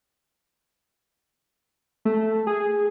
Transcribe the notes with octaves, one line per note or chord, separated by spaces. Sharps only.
A3
G#4